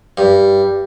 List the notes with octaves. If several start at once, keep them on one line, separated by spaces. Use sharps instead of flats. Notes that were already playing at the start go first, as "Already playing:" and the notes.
G2